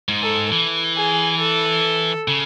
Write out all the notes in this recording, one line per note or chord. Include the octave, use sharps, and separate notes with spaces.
G#2
A4
E3
G#4
A4
C#3